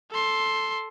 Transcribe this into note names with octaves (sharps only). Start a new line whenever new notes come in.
A4 C6